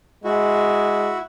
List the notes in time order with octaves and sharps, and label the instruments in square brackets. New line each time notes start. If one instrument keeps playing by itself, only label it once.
[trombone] G#3 [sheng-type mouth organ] E4 F#4